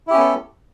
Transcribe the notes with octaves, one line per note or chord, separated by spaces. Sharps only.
B3 C#4 E4 G4 A4